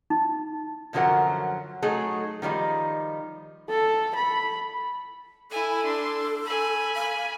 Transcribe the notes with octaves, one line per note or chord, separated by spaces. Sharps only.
D#4
F#2 D3 F3 F#3 A#4 F#5
F#3 A3 D#4 G#4
D#3 F3 G3 D#4
A4
B5
E4 A4 G#5
D4 C6
G#5 B5
F5